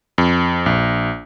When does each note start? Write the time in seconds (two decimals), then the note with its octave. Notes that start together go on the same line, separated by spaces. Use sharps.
0.18 F2
0.66 A#1